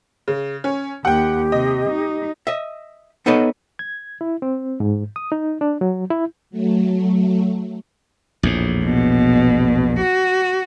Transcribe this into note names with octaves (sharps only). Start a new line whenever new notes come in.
C#3
C#4
D#2 G4 F#5 G5
C3 D#5
D#4
D#5 E5
B3 D#4 A4 B4 C#5 D#5
G#6
E4
C4
G#2
D#6
D#4
D4
F#3
E4
F#3 A3
A#1 E2 A2
B2
F#4